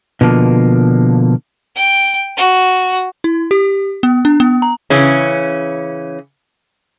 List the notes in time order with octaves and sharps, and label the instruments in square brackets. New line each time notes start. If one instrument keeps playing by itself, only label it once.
[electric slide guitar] B2 D3 F3 A#3
[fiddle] G5
F#4
[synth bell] E4
G4
B3
D4
B3
A#5
[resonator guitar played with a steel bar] C#3 E3 C#4